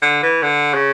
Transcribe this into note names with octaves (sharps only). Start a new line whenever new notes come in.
D3
E3
D3
C#3